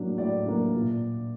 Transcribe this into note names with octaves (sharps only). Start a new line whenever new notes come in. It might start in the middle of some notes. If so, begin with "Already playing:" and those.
Already playing: A2 F#3 A#3 D4
A2 D5
F#3 A#3 D4
A#2